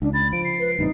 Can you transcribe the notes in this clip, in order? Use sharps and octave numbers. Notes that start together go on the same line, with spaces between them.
C#2 D4
B5 A6
F3 D7
C7
B4
A1 G2 C3 D#4